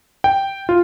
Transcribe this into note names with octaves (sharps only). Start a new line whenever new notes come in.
G5
F4